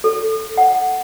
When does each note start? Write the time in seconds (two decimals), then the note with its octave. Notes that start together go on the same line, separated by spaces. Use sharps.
0.04 A4
0.58 F#5